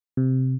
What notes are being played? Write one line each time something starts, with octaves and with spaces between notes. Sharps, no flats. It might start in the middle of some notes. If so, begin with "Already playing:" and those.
C3